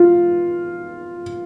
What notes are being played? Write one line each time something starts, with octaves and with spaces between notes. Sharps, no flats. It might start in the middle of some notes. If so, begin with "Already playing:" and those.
Already playing: F4